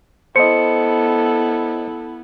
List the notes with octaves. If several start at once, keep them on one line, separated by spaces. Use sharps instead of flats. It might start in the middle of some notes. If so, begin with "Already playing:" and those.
B3 E4 A4 C5 D#5 C#7